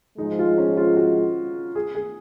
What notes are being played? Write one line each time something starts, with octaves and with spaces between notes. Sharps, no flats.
G#2 F3 G#3 D#4
F4
C#4
F4
F#4
G#4
G#4